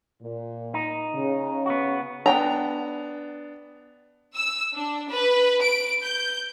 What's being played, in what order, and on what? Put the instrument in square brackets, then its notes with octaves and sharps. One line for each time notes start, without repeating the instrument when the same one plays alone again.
[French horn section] A#2
[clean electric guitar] D#4
[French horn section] C#3
[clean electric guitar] B3 F#4
[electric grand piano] B3 D4 [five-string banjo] G5 A#5
[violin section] E6
D4
B4
D7
G6